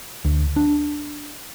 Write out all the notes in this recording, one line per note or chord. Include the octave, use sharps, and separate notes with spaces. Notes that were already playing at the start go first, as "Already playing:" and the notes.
D2
D4